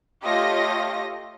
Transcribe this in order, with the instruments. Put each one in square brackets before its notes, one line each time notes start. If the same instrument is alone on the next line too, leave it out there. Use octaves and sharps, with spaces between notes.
[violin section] A3 F4 G4 C#5 D#5 A#6